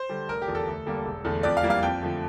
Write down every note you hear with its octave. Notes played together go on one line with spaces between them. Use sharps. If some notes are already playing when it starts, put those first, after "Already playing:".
Already playing: C5
D3 G3
F1 A#4
G4
E2 D3 F3 A3
A4
D2
D3 G3 A#3
E1
E2 D3 A3
F2 D5
F5
E3 G3 A#3
F5
F2 G5
D3 F3 A3